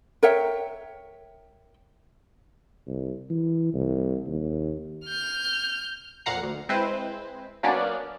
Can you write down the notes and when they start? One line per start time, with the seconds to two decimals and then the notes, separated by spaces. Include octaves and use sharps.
0.23 A#4 C#5 E5 G5
2.87 C2
3.30 E3
3.74 C2
4.27 D#2
5.06 F6 G6
6.26 F2 A#2 F5 F#5 A#5 C7
6.43 D2
6.69 G#3 C4 E4 B4 C5
7.63 F#3 A#3 B3 C#4 D4 D5